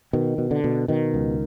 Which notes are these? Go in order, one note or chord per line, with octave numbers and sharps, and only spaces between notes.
B2 D#3
B2
D3
B2
B2 D#3
C#2